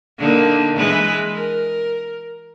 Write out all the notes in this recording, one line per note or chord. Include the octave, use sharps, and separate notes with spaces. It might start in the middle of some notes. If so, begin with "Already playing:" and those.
D3 A#3 D#4
E3 G#3 B4
A#4